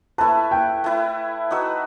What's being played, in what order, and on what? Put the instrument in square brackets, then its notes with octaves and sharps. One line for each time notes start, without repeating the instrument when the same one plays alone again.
[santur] A3 E4 B4 [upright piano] A5
[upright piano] G5
[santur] A3 E4 B4
D#4 F#4 B4 E5